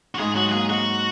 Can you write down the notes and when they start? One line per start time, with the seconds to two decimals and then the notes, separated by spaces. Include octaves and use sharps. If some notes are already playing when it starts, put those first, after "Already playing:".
0.15 F#4
0.19 G#2 G#4
0.36 F#3 F#4
0.49 F#4
0.52 A#3 G#4
0.70 G#2 F#4